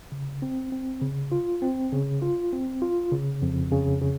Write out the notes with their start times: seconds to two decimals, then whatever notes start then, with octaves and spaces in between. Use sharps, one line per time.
0.12 C#3
0.42 C4
0.72 C4
1.02 C#3
1.32 F4
1.62 C4
1.92 C#3
2.22 F4
2.52 C4
2.82 F4
3.12 C#3
3.42 F2
3.71 C#3
4.01 C#3